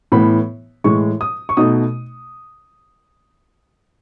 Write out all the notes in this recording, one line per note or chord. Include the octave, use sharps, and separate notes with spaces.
A2 E3 B3 B5
A2 E3 G#3 C#6
D#6
C#6
B2 A3 D#4 D#6